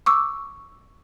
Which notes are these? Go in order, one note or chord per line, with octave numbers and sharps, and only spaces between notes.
C#6 D6 E6